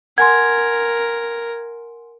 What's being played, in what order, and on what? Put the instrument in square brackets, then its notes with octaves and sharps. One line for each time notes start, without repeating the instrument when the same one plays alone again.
[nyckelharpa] A#4 [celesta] F#5 G#5 C6 [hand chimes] G#6